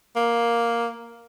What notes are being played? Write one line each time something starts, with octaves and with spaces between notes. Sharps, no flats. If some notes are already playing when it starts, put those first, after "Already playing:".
A#3